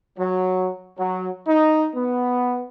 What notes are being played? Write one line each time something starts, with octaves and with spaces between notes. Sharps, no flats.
F#3
F#3
D#4
B3